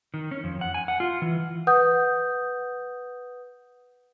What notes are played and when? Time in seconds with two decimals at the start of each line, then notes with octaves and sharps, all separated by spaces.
0.14 D#3
0.31 C#4
0.44 F2
0.61 F#5
0.74 G#5
0.88 F#5
1.00 F4
1.22 E3
1.67 B4 F#5 D#6 G6